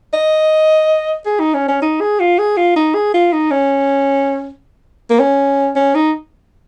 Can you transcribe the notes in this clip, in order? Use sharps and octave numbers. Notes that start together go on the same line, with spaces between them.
D#5
G#4
D#4
C#4
C#4
D#4
G#4
F4
G#4
F4
D#4
G#4
F4
D#4
C#4
A#3
C#4
C#4
D#4